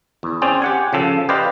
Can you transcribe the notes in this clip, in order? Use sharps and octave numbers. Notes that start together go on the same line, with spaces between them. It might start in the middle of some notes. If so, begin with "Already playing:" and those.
E2
C4 C#4 G#4 C5 D5
G4 F#5 G#5
C#3 F3 A4
G4 B4 C5 D5 D#5 F5